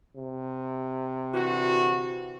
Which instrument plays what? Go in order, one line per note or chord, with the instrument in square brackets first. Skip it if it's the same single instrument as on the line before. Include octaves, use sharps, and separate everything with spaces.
[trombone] C3
[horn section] D3 E3 F#4